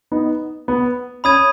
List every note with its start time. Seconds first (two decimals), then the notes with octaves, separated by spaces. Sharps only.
0.12 B3 D#4
0.68 B3
1.24 C#4 B5 D#6 G#6 D#7